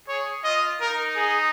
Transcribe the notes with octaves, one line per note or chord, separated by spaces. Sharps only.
G#4 C#5
F4 D#5
D#4 A#4
G#4